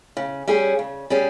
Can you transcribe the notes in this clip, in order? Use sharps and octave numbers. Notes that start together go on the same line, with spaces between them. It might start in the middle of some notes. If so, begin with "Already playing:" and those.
C#3
G3 C#4 G#4
C#3
G3 C#4 G#4